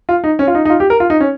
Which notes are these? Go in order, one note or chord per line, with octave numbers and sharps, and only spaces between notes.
F4
D#4
C#4
F4
D#4
D#4
F4
G4
A#4
F4
D#4
C#4